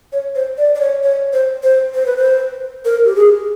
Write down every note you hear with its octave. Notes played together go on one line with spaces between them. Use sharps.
C#5
C5
D5
D5
C#5
C#5
C5
C5
C5
B4
C5
A#4
G4
G#4